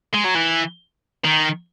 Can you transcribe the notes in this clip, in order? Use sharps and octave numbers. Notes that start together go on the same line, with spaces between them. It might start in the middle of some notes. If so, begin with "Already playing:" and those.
G#3
F#3
E3
D#3